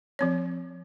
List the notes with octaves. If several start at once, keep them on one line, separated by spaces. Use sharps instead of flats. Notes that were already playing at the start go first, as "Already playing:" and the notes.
F3 C4 C#5